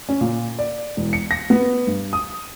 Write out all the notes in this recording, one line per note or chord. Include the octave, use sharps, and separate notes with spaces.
C#4
A#2
D5
E1
C#7
A#6
B3
G2
D#6